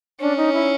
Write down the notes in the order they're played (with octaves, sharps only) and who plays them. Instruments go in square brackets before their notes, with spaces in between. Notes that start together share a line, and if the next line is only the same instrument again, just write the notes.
[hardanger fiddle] C#4 [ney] D4
[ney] D#4
E4